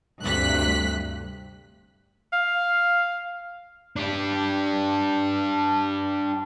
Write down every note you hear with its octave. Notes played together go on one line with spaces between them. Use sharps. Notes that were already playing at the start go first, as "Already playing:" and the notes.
D2 G2 C3 F#6 B6
F5
D4 G4